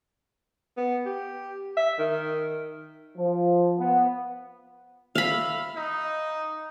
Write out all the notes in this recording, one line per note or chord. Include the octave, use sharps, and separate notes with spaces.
B3
G4
E5
D#3
F3
B3
E5 F5 B5
D#4